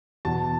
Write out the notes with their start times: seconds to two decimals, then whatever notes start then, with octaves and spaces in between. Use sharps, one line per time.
0.25 E2 B2 A5